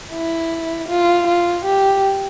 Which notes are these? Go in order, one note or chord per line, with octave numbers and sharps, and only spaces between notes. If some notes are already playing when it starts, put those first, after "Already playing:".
E4
F4
F4
G4